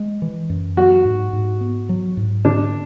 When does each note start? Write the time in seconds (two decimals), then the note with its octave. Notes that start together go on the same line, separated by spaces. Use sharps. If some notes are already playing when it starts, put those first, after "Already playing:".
Already playing: G#3
0.22 E3
0.50 F#2
0.77 F#3 F#4
1.05 G#2
1.33 G#2
1.61 B3
1.89 F#3
2.17 G#2
2.45 D3 D4